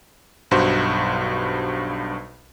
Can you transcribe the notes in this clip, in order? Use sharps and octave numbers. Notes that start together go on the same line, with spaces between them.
B1 G2 F#4 C5